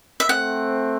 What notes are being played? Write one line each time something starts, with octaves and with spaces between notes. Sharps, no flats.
E5
A3 C4 F#5